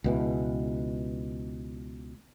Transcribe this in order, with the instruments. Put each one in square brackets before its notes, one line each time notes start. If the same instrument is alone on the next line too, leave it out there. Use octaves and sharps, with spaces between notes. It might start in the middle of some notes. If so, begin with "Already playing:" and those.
[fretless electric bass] C#2 B2 E3